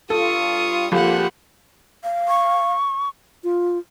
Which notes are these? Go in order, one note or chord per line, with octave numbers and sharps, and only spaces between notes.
G2 G3 F4 A4 C#6 D#6
A#1 G3 A#3 C4 F4 G4 A4 F#5
F5
C#6
F4